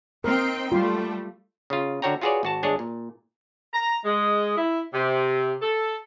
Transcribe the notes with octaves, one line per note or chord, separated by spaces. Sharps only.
C4 D#4 A#4 G5
G3 A3 F4 C6
C#3 F4
D3 F#4 C#5 G5 A#5
F4 F#4 G#4 B4 C#5 D5
G#1 F#4 A5
G1 G#3 D4 G#4 C#5
A#2
A#5
G#3
E4
C3
A4